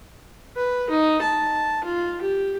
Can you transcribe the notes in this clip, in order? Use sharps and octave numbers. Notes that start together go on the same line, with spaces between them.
B4
D#4
A5
F4
G4